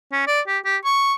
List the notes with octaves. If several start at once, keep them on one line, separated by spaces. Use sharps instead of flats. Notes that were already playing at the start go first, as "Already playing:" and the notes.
C#4
D5
G4
G4
C#6